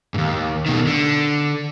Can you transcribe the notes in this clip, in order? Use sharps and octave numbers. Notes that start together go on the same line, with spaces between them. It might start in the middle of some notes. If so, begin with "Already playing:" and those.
D#2 G#2
B2 D#3
D3